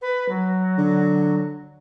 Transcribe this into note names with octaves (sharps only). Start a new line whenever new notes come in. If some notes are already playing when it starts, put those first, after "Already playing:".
B4
F#3
D3